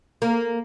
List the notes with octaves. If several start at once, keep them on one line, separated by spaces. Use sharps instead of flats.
A#3